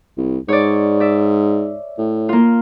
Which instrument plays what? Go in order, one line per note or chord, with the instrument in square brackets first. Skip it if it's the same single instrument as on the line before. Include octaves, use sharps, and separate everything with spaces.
[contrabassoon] C2
[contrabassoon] G#2 [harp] C#5 D5
[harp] D5 E5
[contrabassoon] A2
[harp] A#3 F4